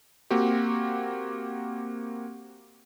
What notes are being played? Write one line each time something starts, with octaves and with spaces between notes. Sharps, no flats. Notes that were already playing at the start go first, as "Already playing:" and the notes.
A#3 C4 F#4 G4